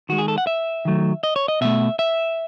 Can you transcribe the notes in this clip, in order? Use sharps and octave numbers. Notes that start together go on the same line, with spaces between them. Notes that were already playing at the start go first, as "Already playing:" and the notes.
D#3 G#3 F#4
G#4
A4
F#5
E5
D#3 F#3 A3
D#5
C#5
D#5
B2 A3 E5
E5